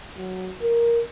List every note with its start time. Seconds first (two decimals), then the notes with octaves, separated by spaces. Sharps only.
0.17 F#3
0.62 A#4